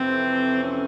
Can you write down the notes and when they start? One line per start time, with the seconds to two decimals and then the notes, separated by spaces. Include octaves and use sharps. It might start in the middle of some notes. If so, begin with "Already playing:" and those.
Already playing: F2 C3 E3 A3 C4
0.63 C#4